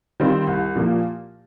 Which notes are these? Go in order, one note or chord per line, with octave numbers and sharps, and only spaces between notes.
D#3 G3 C4 F4
C2
A#2 F3 A#3